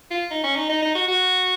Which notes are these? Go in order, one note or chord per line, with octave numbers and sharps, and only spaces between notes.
F4
D#4
C#4
D#4
D#4
D#4
F#4
F#4